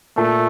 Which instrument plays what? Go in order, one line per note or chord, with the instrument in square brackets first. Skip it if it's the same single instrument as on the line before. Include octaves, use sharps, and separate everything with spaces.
[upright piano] A#2 [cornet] A3